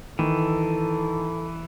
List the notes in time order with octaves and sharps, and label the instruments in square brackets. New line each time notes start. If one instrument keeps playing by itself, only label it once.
[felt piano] D#3 [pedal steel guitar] E3 [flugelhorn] A4